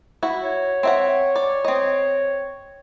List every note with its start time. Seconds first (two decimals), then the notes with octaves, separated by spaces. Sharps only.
0.23 E4 F#4
0.43 C#5
0.83 C4 E5 F#5
1.36 D5
1.65 C4 D#5